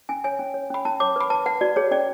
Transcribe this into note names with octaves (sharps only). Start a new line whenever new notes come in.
C#4 G#5
C#5 G#5
C#4
C#5
C#4 B5
C#4 A5
C#5 D6
B4 B5
B4 A5
B4 F#5
F#4 D5
G#4 C#5
C#4 D5